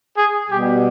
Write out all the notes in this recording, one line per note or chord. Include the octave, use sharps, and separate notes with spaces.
G#4
B2 G3 G4